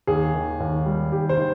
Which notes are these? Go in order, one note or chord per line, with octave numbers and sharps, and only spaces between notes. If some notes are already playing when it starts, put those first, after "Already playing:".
D#2 G#4
D#3
D#2
G3
D#2 G4
C5
D#3